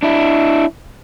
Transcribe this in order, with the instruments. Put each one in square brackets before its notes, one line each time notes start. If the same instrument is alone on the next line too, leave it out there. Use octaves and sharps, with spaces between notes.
[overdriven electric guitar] D4 E4